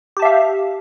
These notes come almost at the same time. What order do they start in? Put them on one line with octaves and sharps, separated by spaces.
G4 A5 E5 F5